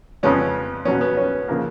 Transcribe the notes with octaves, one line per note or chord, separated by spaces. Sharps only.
F2 C#3 F3 G#3 B3 C#4
B2 F#3 B3 C#4
B3
C#4
C#3 F3 A#3